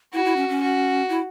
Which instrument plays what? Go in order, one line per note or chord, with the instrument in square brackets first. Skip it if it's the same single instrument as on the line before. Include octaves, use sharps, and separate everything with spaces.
[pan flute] E4 [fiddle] F#4
[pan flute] E4
C#4
C#4
[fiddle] F#4
[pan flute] E4